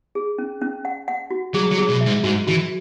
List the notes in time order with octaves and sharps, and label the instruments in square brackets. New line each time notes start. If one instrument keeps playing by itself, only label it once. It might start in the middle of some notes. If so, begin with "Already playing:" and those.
[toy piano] G#4
C#4
C#4
F#5
F#5
F#4
[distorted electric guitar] F#3 [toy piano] G#4
[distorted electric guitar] F#3
[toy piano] G#4
[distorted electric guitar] B2
[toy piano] E5
[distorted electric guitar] G#2
[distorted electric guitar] G#2 [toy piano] F#4
[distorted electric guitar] E3 [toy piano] F#4